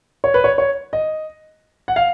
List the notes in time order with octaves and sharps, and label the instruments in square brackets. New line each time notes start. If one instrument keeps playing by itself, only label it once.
[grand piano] C#5
B4
C#5
C#5
D#5
F#5
F5